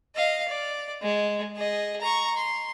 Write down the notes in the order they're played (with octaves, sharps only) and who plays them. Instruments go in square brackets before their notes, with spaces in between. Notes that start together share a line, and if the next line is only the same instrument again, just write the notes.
[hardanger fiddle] D#5 F5
D5
G#3
G#4 D#5
A#5 C#6
C6